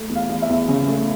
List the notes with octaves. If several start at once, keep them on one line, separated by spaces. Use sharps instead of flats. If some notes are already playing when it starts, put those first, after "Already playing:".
Already playing: A3
E2
F5
E2
E5
E2
C#3
A3